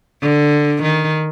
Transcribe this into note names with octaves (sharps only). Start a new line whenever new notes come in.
D3
D#3